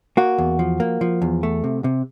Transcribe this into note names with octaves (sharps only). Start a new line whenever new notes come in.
A#3 F#4
E2
F3
A#3
F3
E2
A3
C3
C3